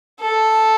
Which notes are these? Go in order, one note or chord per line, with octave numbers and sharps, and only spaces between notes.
A4